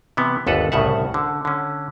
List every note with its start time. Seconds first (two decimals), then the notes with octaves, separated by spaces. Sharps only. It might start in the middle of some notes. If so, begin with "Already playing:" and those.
0.17 C3 E3 B3
0.47 G1 D#2 A4 B4 F#5
0.72 C2 A2 C#3 E5 F#5
1.14 D3
1.45 D3 C#4